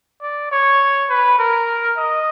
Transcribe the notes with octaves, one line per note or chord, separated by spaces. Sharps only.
D5
C#5
B4
A#4
D#5